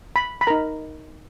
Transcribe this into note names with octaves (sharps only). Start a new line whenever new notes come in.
B5
B5
D#4 A#4 A#5